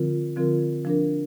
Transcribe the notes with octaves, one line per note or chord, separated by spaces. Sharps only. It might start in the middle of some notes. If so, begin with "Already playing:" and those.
Already playing: D3 F3 C4 F4 A#4
D3 F3 C4 F4 A#4
F3 D4 A#4